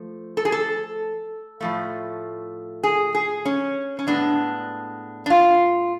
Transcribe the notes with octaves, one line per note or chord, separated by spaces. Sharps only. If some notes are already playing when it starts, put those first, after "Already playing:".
Already playing: F3 A3
A4
G#4
A4
A2 F3 A3
G#4
G#4
C#4
C#4
A2 G#3 B3 D4
D4
F4